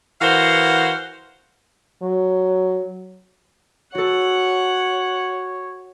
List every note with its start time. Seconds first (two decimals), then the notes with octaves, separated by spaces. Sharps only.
0.21 E3 F#4 A#4 C5 F5 F#5
2.02 F#3
3.95 F#4 A4 C#5 F#5